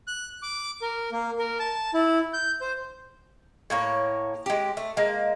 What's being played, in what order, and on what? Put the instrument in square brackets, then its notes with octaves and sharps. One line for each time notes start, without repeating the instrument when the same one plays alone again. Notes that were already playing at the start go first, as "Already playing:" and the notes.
[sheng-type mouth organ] F#6
D6
A#4
A#3
A#4
A5
E4
G6
C5
[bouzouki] A2 A#3 C#5
G#3 G4
A3
G#3 A#3